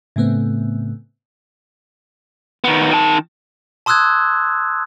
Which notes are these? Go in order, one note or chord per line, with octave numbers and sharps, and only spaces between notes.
A2 C#3 A3 B3 C4
D#3 B3
D#3 A5
A5 C6 D#6 E6 F#6 G#6